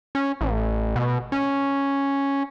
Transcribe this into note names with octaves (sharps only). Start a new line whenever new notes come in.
C#4
A1
B2
C#4